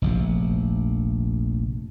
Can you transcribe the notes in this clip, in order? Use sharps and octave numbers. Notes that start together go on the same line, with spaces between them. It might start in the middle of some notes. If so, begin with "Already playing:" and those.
F1 A#1 C3